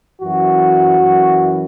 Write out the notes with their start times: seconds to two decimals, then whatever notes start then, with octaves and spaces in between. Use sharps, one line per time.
0.21 F#2 E3 F#4
0.99 F#2 E3